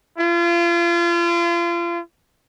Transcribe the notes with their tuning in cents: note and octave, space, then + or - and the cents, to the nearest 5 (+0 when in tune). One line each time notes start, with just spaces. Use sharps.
F4 -35